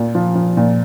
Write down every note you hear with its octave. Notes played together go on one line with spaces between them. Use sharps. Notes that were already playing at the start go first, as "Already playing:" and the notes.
Already playing: A#2
F3
F3
A#2